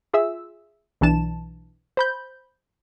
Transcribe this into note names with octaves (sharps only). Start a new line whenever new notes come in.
F4 G#4 E5 E6
B1 E3 D4 A5 E7
C5 B5 G6